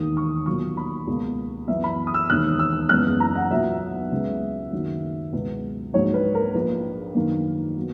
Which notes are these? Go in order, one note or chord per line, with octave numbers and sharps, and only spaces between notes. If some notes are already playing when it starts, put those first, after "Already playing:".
Already playing: E1 D#2 D#3 A#3 D#6
C#6
B1 A#2 F#3 A#3 C#6
B5
C#2 B2 A#3
F#2 E3 B3 E5
B5
D#6
E6
E1 D#2 D#3 F#6
E6
F#1 E2 C#3 G#3 B3 F#6
A#5
F#5
B1 A#2 F#3 B3 E5
C#2 C#3 G#3 B3
F#2 D#3 F#3 A#3
C#2 B2 G#3 B3
A#1 G#2 F#3 C#5
B4
A#4
A#1 A#2 A#3 B4
F#2 D#3 A#3
F#3 B3